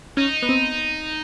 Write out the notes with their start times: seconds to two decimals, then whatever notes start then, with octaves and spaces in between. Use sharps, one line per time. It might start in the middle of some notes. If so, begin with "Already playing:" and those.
0.17 C#4 D#4
0.43 B3
0.49 C4